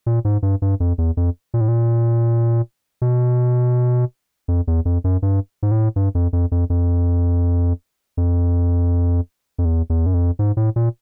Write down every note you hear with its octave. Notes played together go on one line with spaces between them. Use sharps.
A#2
G#2
G2
G2
F2
E2
F2
A#2
A2
A#2
B2
F2
E2
F2
F#2
G2
G#2
A2
G2
F2
F2
F2
F2
F2
F2
E2
E2
F#2
F2
G#2
A2
A#2